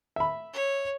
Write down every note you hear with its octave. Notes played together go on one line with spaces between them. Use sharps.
E5 B5
C#5